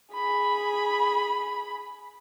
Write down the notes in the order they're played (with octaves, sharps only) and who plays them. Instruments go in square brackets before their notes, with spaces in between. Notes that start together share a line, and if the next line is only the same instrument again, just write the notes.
[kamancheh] G#4 B5